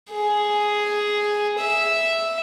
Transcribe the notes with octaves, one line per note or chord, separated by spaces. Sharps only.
G#4
E5